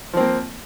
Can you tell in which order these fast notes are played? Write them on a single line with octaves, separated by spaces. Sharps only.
F3 C4 A#3